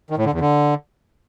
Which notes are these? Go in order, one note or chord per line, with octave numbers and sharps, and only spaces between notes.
D#3
A2
D3
E2
D3